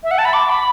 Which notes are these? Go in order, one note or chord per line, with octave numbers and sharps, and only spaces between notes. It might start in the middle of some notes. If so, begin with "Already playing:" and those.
E5
F#5
A5
B5
D6
B5